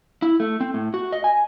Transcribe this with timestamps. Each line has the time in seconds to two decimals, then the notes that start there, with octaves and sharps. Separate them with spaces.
0.22 E4
0.40 A3
0.61 C4
0.74 A2
0.94 F#4
1.12 D#5
1.24 G#5